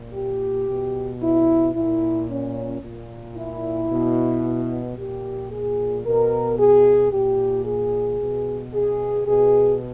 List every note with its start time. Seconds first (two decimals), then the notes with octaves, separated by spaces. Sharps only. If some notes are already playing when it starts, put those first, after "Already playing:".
Already playing: A#2
0.14 G4
0.68 B2
1.22 E4
1.75 A#2 E4
2.29 C#4
2.82 A#2
3.36 E4
3.90 B2
4.97 A#2 G4
5.51 G#4
6.04 B2 A#4
6.58 G#4
7.12 A#2 G4
7.65 G#4
8.19 B2
8.73 G#4
9.26 B2 G#4